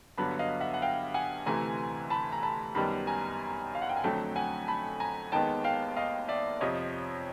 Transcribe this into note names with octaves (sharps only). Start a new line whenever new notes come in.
G2 D3 F#3 B3 A5 B5
D#5 F5
E5 F#5
F#5
F5 G5
F#5 G#5
D2 C3 E3 A3 G#5 A#5
A5 B5
A#5
A5 B5
F#2 D#3 G3 B3 A5 B5
G#5 A#5
F5
F#5
G5
G#5
F2 D3 F#3 A3 C4 G5 A5
F#5 G#5
A5 B5
G#5 A#5
D#2 D#3 G#3 B3 G5 A5
F5 G5
D#5 F5
D5 E5
F2 C3 F3 C#5 D#5